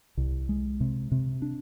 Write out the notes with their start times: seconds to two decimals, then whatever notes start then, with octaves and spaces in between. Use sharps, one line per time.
0.17 C2
0.49 G#3
0.80 C3
1.12 C3
1.42 D4